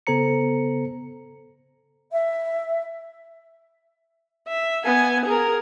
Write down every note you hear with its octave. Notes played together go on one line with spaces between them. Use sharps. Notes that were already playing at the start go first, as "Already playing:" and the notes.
C#3 B3 A4 C5 A#5 C#7
E5
E5
B3 G#5
G#4 A#4